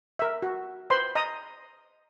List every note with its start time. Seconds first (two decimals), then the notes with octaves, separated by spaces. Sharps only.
0.19 A#4 E5
0.42 F#4
0.90 B4 C5 B5 C6
1.15 D#5 A#5 D#6